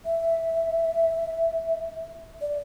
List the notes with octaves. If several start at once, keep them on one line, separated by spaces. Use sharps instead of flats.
E5
D5